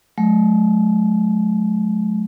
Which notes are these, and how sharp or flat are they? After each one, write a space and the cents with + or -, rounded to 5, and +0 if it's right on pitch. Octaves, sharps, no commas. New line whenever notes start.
F#3 -20 A3 -40